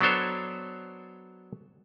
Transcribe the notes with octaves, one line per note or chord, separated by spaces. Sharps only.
F#3 B3 D4 A4 C5 C#5